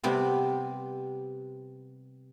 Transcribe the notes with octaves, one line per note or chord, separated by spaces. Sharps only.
C3 G3 B3 C4